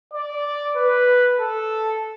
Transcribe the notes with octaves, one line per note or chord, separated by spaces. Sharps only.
D5
B4
A4